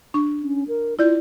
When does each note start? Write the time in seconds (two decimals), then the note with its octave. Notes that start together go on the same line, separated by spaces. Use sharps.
0.14 D4 C#6
0.43 C#4
0.68 A#4
0.99 E4 F4 D5 G6